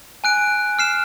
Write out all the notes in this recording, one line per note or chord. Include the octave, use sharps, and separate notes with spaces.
G#5 F#6 D7
F6 C7 E7